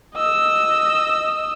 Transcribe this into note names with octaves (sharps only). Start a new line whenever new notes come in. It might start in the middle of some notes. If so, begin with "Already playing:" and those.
D#5 E6